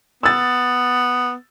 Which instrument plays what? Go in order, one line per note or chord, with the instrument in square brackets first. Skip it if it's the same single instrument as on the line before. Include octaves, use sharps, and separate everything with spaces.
[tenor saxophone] B3 [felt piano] E6 A6